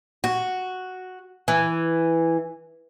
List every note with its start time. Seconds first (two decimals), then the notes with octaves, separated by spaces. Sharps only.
0.24 F#4
1.48 E3